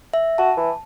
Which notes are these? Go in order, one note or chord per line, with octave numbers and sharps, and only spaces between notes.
E5
F#4 A5
E3